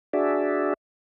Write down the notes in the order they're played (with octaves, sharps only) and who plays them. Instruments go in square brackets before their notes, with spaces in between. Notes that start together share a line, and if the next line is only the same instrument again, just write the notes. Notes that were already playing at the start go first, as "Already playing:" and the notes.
[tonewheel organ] D4 F#4 G#4 D5 E5